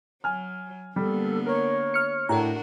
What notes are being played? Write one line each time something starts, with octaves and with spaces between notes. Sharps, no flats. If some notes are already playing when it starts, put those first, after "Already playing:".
F#3 G#5 F6
D3 G3 A#3 B3 A4
A#4 C#5
F6 C#7
A2 D4 F#4 A4 A#4 G5 A#5